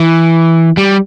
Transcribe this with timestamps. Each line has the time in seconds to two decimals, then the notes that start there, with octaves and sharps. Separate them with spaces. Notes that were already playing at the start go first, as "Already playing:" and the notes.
Already playing: E3
0.77 G3